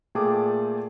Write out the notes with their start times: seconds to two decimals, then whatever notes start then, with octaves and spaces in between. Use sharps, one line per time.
0.15 A#2 A3 G#4 G5 A5 D6